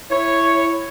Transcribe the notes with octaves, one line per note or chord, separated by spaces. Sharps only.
E4 C#5